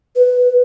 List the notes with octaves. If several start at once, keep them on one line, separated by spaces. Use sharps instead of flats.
B4